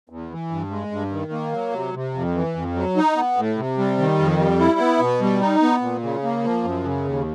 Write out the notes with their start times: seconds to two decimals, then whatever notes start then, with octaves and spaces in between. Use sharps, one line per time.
0.10 E2
0.30 E3
0.51 G2
0.71 G#3
0.91 G2
1.12 D#3
1.32 A#3
1.53 F#3
1.74 C3
1.94 C3
2.14 F2
2.35 E3
2.55 F2
2.75 F#3
2.97 D#4
3.16 B3
3.37 A2
3.58 C3
3.78 G3
3.98 D#3
4.19 F2
4.39 G3
4.59 E4
4.79 B3
5.00 B2
5.21 G3
5.41 D#4
5.62 B3
5.81 A#2
6.03 C#3
6.23 A#3
6.44 F3
6.64 F#2
6.84 C#3
7.05 D#2